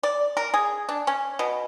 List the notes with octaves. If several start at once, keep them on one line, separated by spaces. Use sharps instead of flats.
D5
A#4
G#4
D4
C#4
B2